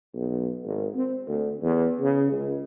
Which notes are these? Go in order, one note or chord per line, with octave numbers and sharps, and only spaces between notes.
B1
G#1
C4
D2
E2
C#3
C#2